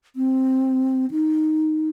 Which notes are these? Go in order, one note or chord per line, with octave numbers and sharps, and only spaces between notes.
C4
D#4